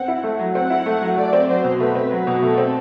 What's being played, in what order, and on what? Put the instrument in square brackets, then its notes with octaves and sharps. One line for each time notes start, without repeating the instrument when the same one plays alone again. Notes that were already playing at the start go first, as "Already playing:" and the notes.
Already playing: [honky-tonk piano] C4 [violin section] F#5
[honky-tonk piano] E4
A3
F#3
[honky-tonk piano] C4 [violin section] F#5
[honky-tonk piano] E4
A3
F#3
[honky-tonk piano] A3 [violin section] D5
[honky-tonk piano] C4
[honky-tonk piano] F#3 [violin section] C5
[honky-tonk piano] B2
[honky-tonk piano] A3 [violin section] B4
[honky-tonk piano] C4
F#3
B2
[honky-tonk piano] A3 [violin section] A4
[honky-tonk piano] C4